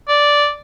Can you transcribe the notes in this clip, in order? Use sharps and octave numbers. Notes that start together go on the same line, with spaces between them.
D5